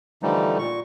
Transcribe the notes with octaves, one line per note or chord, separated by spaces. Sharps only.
D3 E3 F3 G3 A3 D#4
A#2 C#6